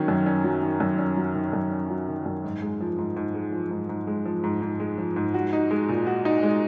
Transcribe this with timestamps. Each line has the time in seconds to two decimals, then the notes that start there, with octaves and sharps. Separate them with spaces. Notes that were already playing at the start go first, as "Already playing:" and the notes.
Already playing: D#3 F#3 C#4
0.08 F#2
0.26 C#4
0.44 F#3
0.62 D#3
0.80 F#2
0.98 C#4
1.17 F#3
1.35 D#3
1.53 F#2
1.71 C#4
1.90 F#3
2.08 D#3
2.26 F#2
2.44 G#2
2.62 G#3
2.81 F3
2.98 G#2
3.16 G#2
3.34 G#3
3.52 F3
3.71 G#2
3.89 G#2
4.07 G#3
4.26 F3
4.44 G#2
4.62 G#2
4.80 G#3
4.98 F3
5.16 G#2
5.34 F#4
5.53 D#4
5.71 G#3
5.89 A#2
6.07 F#4
6.25 D#4
6.43 G#3